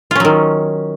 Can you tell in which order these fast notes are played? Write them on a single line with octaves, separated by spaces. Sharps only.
F4 C#4 F#3 D#3